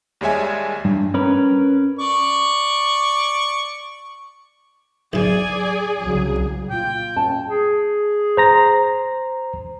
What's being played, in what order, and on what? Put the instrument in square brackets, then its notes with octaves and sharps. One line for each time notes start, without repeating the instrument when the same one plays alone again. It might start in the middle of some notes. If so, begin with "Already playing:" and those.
[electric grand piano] D#2 G3 G#3 C#5 E5 G#5
[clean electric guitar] G2
C#4 A#4 B4
[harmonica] D5 C#6
[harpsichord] B1 C3 [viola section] G#4 D5 G#5
[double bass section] C2 C#3 F#3 [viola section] G#4
[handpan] A#2 F4 [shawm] G5
[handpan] C#4 [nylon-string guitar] A5
[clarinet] G#4
[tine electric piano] C5 A#5 A#6